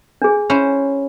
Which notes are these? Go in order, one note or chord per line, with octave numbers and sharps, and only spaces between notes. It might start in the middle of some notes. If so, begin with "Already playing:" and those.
D4 G#4
C#4 E4 C5